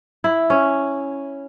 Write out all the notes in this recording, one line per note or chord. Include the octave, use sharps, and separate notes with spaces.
E4
C#4